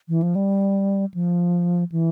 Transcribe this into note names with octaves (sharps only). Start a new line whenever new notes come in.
E3
F3
G3
F3
E3